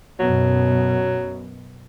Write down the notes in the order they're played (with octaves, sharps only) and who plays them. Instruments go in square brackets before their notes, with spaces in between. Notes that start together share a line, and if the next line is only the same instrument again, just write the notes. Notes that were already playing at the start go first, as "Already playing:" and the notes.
[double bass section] F#2 B2 [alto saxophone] F#3